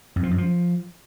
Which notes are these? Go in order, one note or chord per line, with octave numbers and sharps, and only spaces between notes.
F2
F3
F#2
F3